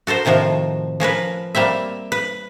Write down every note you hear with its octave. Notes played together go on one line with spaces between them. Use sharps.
F#4 A4 A#4 C5
A2 C3 D#3 F3 F#4
F3 C#4 A#4 B4
G3 A#3 C4 E5
B4